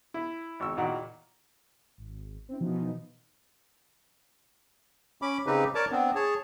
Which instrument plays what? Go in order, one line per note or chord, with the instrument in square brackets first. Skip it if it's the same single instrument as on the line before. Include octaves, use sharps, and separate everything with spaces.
[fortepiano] E4
G#1 C#6 E6
E2 A#2 D#3 F#4
[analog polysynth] G#1
C4 C#4 E4
B2 E3 F3 B3 D#4
[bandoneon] C#4 B5 D6
C#3 C4 D#4 G4 B4
A#4 C#5 D5 A5 D6
B3 C4 D4
G#4 C#5 A5